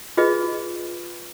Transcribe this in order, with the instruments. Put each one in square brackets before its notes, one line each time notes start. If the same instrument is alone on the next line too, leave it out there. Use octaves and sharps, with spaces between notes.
[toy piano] F4 G#4 B4 D#5